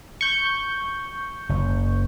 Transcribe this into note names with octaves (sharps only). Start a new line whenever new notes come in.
C#6 G6
F#1